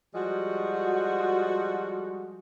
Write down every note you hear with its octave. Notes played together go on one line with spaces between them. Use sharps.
F3 G3 G#3 F#4